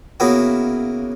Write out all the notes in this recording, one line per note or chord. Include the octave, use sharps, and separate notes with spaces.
C#3 A#3 B3 E4 F#4